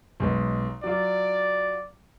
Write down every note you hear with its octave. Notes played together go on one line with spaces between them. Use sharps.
B1 G#3 B4
F#3 F4 D5